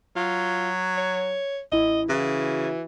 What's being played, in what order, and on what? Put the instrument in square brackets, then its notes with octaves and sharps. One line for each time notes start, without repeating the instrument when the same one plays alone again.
[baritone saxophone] F#3 [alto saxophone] F4
[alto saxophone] C#5
[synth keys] A1 E4 [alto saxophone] D#5
[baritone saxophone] C#3 [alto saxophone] E3 [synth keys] F#4